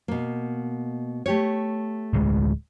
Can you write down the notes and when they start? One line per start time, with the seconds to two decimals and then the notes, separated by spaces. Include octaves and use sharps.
0.08 B2 A#3
1.26 A3 G4 C#5
2.13 D1 D2 G#3